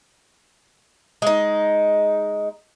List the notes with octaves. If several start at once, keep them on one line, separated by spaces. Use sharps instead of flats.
G#3 D#4